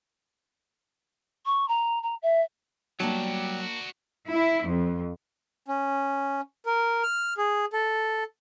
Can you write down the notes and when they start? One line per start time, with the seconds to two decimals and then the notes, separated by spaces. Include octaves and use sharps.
1.46 C#6
1.68 A#5
2.03 A#5
2.22 E5
3.00 F#3 G3 A#3 D4 F#4 D5 A5
4.28 E4
4.66 F2
5.68 C#4
6.66 A#4
7.03 F6
7.38 G#4
7.73 A4